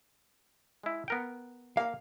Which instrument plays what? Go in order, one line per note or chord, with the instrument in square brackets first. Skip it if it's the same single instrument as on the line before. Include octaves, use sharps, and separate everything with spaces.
[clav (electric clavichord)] G#3 E4
B3 A#4 G5
[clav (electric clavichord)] A#3 [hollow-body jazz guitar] F5